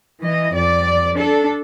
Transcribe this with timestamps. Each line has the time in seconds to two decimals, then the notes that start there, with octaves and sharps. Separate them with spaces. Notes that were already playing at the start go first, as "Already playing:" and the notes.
0.21 E3 D#5
0.55 F2 D5
1.17 D4 A4